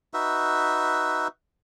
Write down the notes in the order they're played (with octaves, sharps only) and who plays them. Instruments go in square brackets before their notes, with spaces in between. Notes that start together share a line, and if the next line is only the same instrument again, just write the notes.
[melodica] D#4 F#4 B4 E5